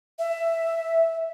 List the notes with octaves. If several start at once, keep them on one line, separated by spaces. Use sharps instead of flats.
E5